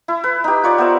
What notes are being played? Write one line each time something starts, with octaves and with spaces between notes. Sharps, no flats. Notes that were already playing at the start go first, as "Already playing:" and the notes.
E4
B4
D#4 G4
F4 C#5 D5
B3 A#4 C5 E5